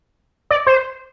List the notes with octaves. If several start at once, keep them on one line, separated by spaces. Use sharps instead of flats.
D5
C5